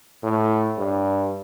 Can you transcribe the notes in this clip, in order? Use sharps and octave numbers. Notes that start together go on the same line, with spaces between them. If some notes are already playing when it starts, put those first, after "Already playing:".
A2
G2